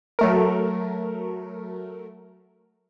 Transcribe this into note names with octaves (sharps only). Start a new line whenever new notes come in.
F#3 A3 A#4